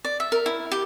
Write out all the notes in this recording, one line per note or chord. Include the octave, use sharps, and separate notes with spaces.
D5
E5
A#4
E4
G4